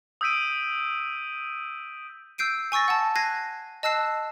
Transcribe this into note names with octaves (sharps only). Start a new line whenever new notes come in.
D#6 E6 G6 B6 D7 D#7
E6 G6 C7 D7 D#7
G#5 C#6 E6 A6 A#6
F#5 A5
F#6 G#6 A#6 C7 D#7
D#5 A5 E6 F#6 C7 E7